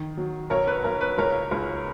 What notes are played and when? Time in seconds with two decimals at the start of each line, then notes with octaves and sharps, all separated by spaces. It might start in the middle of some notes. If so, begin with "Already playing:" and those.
Already playing: D#3
0.17 F#3
0.50 B1 A#4 C#5
0.67 B4
0.84 B1 A#4
1.01 B4
1.18 C#2 A#4 C#5
1.51 C#2